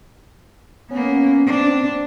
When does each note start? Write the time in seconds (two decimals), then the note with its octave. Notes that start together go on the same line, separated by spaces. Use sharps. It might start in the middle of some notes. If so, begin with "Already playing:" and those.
0.91 A#3 B3 C#4
1.47 C4 D4